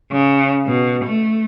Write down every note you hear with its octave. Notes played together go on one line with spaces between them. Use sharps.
C#3
B2
A3